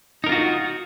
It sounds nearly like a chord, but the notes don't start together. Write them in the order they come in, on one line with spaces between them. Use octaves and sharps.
D#4 A#4 F4 F#4